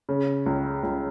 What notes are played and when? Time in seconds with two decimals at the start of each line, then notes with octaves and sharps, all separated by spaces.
0.09 C#3
0.46 C#2
0.83 C#2